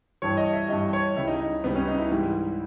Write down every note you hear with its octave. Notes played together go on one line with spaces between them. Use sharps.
G2 E3 G3 C#5
D#5
E5
G2 E3 G3 D#5
C#5
C#2 C#3 G3 E4
D#4
D#4
C#2 C#3 G3 B3
C#4
D#4
E4
G#2 E3 G3